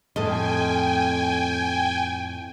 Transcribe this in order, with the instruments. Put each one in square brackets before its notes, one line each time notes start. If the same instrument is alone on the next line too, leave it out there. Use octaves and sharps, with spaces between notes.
[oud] F2 [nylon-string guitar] A2 A4 D#5 [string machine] G5 G#5